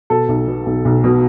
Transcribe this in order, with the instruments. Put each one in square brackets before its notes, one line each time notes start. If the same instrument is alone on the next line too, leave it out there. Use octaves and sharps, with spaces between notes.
[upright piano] B2 A4
B1
B2
B1
B1
B2